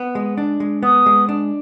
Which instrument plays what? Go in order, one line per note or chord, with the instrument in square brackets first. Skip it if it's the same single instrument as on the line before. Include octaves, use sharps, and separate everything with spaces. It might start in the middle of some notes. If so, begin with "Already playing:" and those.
Already playing: [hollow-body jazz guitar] B3
G#3
D4
G#3
[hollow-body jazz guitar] B3 [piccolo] D#6
[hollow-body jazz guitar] G#3
D4